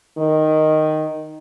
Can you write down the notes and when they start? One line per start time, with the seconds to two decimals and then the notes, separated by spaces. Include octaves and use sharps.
0.17 D#3